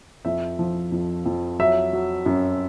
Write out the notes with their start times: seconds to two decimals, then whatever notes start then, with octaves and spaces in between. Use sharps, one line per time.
0.25 F2 E5
0.59 F3
0.92 F2
1.25 F2
1.59 F#3 E5
1.93 F#3
2.26 F#2